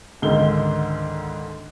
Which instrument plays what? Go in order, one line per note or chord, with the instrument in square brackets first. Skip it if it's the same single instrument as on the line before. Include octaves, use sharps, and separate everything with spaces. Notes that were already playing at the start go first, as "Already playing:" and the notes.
[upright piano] C#2 G#2 D3 D#3 G#4 G7